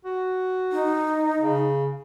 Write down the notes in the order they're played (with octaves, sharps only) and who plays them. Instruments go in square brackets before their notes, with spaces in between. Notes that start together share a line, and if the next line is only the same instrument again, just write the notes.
[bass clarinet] F#4
[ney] D#4
[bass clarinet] C#3